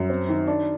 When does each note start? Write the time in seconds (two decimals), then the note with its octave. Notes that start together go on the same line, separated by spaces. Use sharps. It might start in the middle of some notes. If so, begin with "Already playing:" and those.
Already playing: F#2
0.10 C4
0.29 D#3
0.47 D4